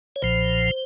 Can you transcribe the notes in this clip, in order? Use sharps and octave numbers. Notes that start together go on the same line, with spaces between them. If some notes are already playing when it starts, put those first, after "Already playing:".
C#5
B1 A#2 F3 C5